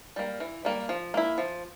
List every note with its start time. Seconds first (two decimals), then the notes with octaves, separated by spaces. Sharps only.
0.16 G3 A#3
0.40 E3
0.65 G3 A#3
0.89 F3
1.14 A#3 E4
1.38 F3